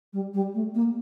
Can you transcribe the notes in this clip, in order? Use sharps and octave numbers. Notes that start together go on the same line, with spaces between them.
G3
G3
A3
A#3